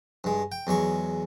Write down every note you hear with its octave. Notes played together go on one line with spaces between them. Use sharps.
G2 G#3
G5
E2 F#3 G#3 C#6